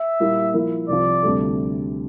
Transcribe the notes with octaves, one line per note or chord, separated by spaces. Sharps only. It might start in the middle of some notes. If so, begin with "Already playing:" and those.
Already playing: E5
A#2 G3 A#3 E4
F3 A#3 E4 A#4
C2 C3 F3 D5
D2 C3 G3 D4 A4